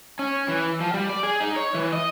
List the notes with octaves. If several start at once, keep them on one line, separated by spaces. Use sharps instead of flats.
C#4
E3
F3
G3
D5
G#4
D#4
C#5
E3
D#5